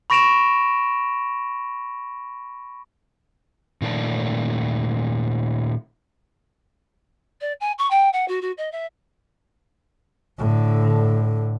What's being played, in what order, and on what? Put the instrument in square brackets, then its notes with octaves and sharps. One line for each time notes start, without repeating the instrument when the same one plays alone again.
[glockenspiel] B5 C#6 A#6 D7 E7 F7
[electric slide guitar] A#2 D#3 A3 A4 D5 A5
[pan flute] D5
G#5
C#6
G5
F#5
F#4
F#4
D#5
E5
[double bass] A2 D3